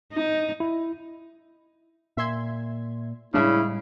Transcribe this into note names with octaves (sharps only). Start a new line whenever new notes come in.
D#4
E4
A#2 E5 C6 G#6
A2 C#3 G3 G#3 D4 E4 E5